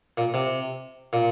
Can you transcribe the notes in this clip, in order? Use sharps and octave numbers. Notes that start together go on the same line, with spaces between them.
A#2
C3
A#2